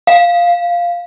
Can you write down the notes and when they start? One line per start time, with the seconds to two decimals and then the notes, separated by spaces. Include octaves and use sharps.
0.07 F5